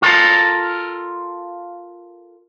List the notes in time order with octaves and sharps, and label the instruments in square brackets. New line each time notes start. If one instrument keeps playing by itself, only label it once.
[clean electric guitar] F4 A4 A#4